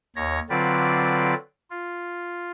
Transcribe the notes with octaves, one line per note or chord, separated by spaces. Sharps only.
D#2 C#5 A#6
D3 F#3 C4 F4 B4 D5
F4